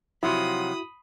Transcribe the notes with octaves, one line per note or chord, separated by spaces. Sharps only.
C3 F3 F#3 E4 F#4 B5 D#6